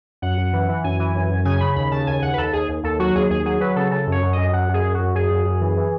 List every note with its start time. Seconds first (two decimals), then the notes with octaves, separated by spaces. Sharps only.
0.22 F#2 F#5
0.37 F#2
0.53 E3
0.69 E3
0.84 F#2 G#5
0.99 E3
1.15 F#2
1.30 F#2
1.45 C#3 G#5
1.60 C#3 B5
1.76 D#2 B5
1.92 C#3 A5
2.07 D#2 G#5
2.22 D#2 F#5
2.34 B4
2.37 D#2 A4
2.53 D#2 G#4
2.68 D#2
2.83 D#2 A4
2.99 F#3 F#4
3.15 D#2 G#4
3.30 D#2 G#4
3.45 F#3 G#4
3.61 F#3 B4
3.76 C#3 A4
3.91 C#3 A4
4.07 F#2 C#5
4.22 F#2
4.33 F#2 D#5
4.53 F#2 F#5
4.69 F#2 G#4
4.84 F#2
4.94 F#2 F#4
5.15 F#2 G#4
5.30 F#2
5.46 F#2
5.61 E3
5.77 E3